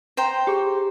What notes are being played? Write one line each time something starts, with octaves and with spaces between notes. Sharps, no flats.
C5 G5 A#5
G4 G#4